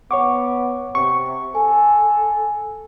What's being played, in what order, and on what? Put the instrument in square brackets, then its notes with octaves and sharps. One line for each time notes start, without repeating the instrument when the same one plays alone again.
[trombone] B3 [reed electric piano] C#5 C#6 D6 [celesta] F#5
[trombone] C3 [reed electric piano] C#6
[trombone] A4 [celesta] G#5